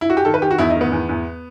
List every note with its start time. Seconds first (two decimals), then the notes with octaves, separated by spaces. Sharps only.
0.01 E4
0.10 F#4
0.17 G4
0.25 D#3 A4
0.34 B4
0.42 D#3 G4
0.51 F#4
0.58 E2 E4
0.70 D#4
0.76 D#3
0.81 B3
0.92 E2
1.09 E2